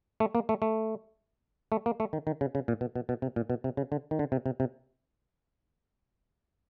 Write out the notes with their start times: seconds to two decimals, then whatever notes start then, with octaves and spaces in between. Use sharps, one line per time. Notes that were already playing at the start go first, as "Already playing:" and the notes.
0.20 A3
0.35 A#3
0.49 A3
0.62 A3
1.72 A3
1.86 A#3
2.00 A3
2.13 D#3
2.27 D#3
2.41 C#3
2.55 C#3
2.68 A#2
2.81 B2
2.96 B2
3.09 B2
3.22 C3
3.36 A#2
3.50 B2
3.64 C3
3.77 C#3
3.92 D3
4.11 D#3
4.19 D3
4.32 C3
4.46 C3
4.60 C3